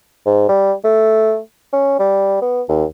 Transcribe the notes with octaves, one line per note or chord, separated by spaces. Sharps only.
G#2
G3
A3
C#4
G3
B3
D#2